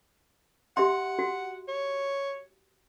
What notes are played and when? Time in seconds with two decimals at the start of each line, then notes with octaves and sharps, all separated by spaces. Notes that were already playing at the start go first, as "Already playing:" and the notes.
0.77 G4 E5 F#5 C6
1.19 F#4
1.68 C#5